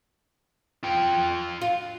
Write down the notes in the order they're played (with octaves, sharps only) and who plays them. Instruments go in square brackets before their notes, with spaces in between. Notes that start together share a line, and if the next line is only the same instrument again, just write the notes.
[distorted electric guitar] F4 G5
[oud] F4